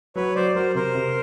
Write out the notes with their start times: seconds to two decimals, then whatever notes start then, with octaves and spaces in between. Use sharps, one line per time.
0.15 F#3 B4 C#5
0.35 F#3 C5 D5
0.55 F#3 A#4 C5
0.75 C3 A#4 C5
0.95 C3